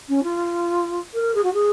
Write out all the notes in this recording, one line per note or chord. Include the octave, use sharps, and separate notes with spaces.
C#4
F4
A#4
G#4
F#4
G#4